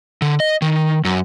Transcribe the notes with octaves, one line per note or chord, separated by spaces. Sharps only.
D3
D#5
D#3
F#2